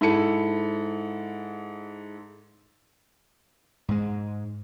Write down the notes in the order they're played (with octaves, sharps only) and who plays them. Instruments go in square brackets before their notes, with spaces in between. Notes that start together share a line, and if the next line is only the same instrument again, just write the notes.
[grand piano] G#2 E4 A4 C#7
[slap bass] G#2 G#3